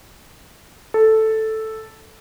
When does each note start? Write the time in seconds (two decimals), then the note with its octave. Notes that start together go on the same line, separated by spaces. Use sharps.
0.94 A4